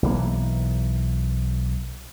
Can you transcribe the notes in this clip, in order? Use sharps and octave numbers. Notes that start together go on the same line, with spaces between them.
B1 E3 A#3